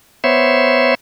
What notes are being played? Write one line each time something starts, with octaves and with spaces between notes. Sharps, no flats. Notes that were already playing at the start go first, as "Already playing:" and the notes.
B3 C5 C#5 E5